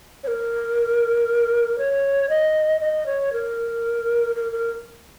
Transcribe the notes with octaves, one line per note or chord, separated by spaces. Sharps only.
C#5
A#4
C#5
D#5
D#5
C#5
A#4
A#4
A#4